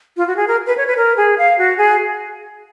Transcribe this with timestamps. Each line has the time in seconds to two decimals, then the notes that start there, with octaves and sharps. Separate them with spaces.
0.17 F4
0.27 F#4
0.36 G#4
0.48 A#4
0.67 B4
0.77 C#5
0.87 B4
0.97 A#4
1.17 G#4
1.38 F5
1.58 F#4
1.78 G#4